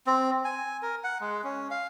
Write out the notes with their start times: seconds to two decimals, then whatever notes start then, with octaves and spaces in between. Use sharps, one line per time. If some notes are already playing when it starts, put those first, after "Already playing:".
0.07 C4
0.45 G#5
0.82 A#4
1.04 F#5
1.21 G#3
1.44 C#4
1.71 F5